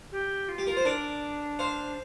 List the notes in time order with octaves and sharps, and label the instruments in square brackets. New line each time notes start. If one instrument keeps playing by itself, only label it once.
[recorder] G4
F4
[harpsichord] G4
[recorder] F4 [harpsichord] A#4
[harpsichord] C5
[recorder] D4 [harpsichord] A#4 D5
[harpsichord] C5 F5